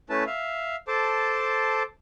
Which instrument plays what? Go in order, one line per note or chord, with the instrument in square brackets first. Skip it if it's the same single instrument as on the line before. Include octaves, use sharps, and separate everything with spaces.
[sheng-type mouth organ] A3 C#4 E4 B4 A5
E5 F5
A4 C5 A5 D6